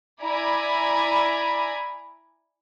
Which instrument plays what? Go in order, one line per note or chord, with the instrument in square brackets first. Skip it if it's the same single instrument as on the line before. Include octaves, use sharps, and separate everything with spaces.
[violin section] E4 D5 G#5 A#5 B5